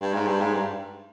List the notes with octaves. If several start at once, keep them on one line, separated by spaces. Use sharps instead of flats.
G2
G#2
G2
G#2
G2